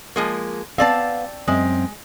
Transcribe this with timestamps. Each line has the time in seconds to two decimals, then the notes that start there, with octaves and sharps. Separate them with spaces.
0.16 F3 G#3 A#3
0.78 B3 C4 D5 F5 A5
1.48 F#2 G#3 C4 E5